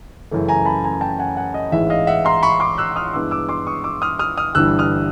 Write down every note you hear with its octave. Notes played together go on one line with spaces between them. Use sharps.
F#2 C#3 E3 A3
G#5 A#5
A5 B5
G#5 A#5
G5 A5
F#5 G#5
F#5 G#5
D#5
A1 G#2 E3 G#3 E5
D#5 F5
E5 F#5
A#5 C6
B5 C#6
C6 D6
E6 F#6
D#6 F6
G2 E3 G#3 B3 D6 E6
D6 E6
C6 D6
C#6 D#6
D6 E6
D#6 F6
D#6 F6
D#6 F6
G1 G2 E3 G3 E6 F#6
D#6 F6